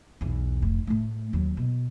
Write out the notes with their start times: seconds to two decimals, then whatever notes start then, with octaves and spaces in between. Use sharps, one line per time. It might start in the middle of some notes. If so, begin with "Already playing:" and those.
0.21 B1 E2
0.62 F1
0.87 A2 A3
1.33 D#2 F#3
1.57 B2